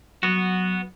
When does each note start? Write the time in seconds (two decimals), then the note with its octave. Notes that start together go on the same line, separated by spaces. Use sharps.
0.23 F#3 B3 F#4